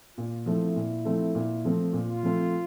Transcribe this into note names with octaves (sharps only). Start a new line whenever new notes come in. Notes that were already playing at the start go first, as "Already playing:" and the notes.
A#2 F4
F3 A3 C4 E4
A#2
F3 A3 C4
A#2
F3 A3 C4
A#2 F4
F3 A3 C4